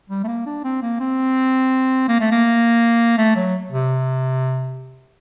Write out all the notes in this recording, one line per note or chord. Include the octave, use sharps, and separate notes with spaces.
G3
A3
A#3
D4
C4
A#3
C4
A#3
A3
A#3
A3
F#3
C3